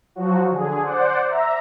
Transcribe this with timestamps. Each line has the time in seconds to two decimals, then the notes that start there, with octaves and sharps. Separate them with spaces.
0.15 F3 F#3 F#4
0.51 D3 G#4
0.82 C5 D5 F#5
1.27 E5 A#5